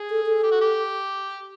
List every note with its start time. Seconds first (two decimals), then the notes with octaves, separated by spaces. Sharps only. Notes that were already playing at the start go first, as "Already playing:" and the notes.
Already playing: G#4
0.10 A4
0.27 A4
0.43 G4
0.52 F#4
0.61 G4